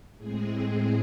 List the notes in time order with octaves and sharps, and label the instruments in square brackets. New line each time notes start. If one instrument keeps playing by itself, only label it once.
[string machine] A2 G#3 C4 G#4
G#4